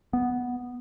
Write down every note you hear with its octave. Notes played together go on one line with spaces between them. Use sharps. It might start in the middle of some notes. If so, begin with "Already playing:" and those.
B3